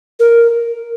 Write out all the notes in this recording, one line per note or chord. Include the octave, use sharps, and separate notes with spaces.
A#4